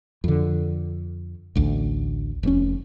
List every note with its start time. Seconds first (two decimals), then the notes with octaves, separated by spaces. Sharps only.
0.24 F2 D3
1.55 A1 D2
2.43 F1 A2 C#4